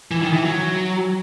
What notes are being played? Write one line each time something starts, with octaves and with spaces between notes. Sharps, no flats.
E3
D#3
E3
F#3